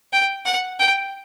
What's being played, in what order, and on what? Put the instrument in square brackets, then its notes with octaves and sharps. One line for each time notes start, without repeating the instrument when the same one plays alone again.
[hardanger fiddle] G5
F#5
G5